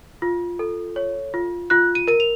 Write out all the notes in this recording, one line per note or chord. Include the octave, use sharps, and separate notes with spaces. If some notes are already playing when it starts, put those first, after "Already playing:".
F4
A4
C#5
F4
F4 F#6
D#7
A#4 D#7
F7